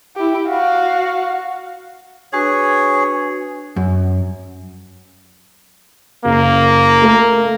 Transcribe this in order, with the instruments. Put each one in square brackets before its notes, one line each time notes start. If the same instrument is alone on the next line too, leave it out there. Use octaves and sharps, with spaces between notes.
[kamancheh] E4 G4
F#4 F5
[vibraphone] D4 F#4 B4 [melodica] G#4 C#5
[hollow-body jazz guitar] F#2
[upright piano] F#1 [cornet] A#3
[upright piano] A3 A4 A#4